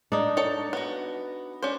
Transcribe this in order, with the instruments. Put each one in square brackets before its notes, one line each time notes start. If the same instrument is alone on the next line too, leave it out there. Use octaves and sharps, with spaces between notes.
[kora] D4 D#4
[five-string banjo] A4 C#5 A5
B3 F#4
C#4 D4 C5